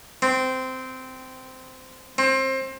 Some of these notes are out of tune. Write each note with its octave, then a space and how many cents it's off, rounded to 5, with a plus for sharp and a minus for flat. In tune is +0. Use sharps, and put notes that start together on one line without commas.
C4 -15
C4 +25